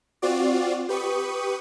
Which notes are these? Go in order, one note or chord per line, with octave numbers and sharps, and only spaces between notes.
C4 F4 F#4 D5
G4 B4 C#6 D#6